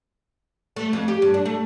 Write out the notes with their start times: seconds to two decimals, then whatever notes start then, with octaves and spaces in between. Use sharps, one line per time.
0.76 A3
0.93 F2
1.08 G4
1.22 G2
1.34 D4
1.46 A3